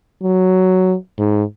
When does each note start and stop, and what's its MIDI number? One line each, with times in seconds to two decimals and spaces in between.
0.22 0.95 54
1.18 1.43 44